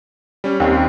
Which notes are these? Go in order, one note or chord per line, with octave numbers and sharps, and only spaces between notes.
G3 C#4
D#2 D#3 C4